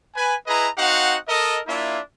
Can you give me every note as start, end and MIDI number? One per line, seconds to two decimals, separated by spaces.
0.15 0.34 71
0.15 0.34 80
0.47 0.67 64
0.47 0.67 68
0.47 0.67 71
0.47 0.67 75
0.47 0.67 82
0.78 1.16 60
0.78 1.16 63
0.78 1.16 66
0.78 1.16 77
0.78 1.16 78
1.28 1.60 69
1.28 1.60 70
1.28 1.60 75
1.67 1.98 58
1.67 1.98 62
1.67 1.98 64
1.67 1.98 65
1.67 1.98 76